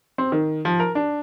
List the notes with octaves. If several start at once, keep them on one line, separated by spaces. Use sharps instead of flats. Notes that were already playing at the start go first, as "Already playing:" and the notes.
C4
D#3
F3
A#4
D4